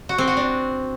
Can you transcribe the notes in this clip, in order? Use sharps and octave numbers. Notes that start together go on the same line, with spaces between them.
F#4
C4
F#4
D4